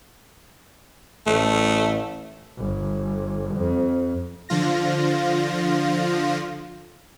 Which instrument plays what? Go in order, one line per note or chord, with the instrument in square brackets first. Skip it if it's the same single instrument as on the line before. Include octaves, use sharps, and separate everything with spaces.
[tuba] A1 [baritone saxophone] A3
[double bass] G1
F2
[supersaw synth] D3 F3 F4 A#6